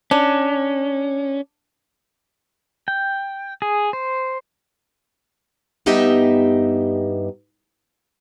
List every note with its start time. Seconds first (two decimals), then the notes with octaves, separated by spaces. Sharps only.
0.11 C#4 D4
2.88 G5
3.62 G#4
3.93 C5
5.86 G2 B3 D#4 G4 D#5 E5